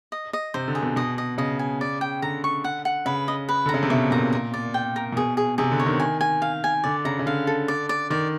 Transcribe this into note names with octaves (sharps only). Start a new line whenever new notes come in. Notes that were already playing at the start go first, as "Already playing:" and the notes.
D#5
D#5
C3 C5
D3
G#4
B2
B2 D#5
D#5
C#3 D#5
G#5
D5
G5
D3 A#5
C#6
F#5
F#5
C#3 B4
D#5
B4
D3
A#5
C#3
C3
B2 E5
A#2 A#5
A#4
D5
G5
A#4
A#2
B2 G#4
G#4
C3 G#4
D3
C#5
D#3
G#5
G#5
F5
G#5
D3 D5
C#3 A#5
C#3
D3 F5
A4
D5
D5
D#3 D5